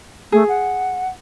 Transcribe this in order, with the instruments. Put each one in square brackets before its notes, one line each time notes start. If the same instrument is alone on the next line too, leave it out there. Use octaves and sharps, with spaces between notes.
[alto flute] A3 [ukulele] G#4
[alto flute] F#5